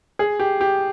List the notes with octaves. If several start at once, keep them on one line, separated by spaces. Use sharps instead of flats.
G#4
G4
G4